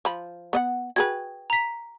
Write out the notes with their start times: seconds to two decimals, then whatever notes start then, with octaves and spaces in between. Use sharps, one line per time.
0.05 F3 B5
0.53 B3 D#5 F#5
0.96 F#4 G#4 B4 G5 G#6
1.50 A#5 B6